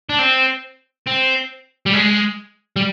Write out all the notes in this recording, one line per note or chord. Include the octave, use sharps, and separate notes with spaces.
D4
C4
C4
G3
G#3
G3